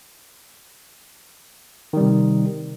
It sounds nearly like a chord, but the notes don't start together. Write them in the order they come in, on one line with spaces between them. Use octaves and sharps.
D#3 G3 C3